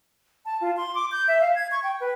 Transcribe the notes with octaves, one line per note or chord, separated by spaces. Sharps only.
A5
F4
C6
D6
G6
E5
F5
G#6
C#6
G5
B4